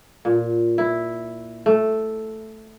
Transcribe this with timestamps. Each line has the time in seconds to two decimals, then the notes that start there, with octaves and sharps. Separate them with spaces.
0.25 A#2
0.78 E4
1.66 A3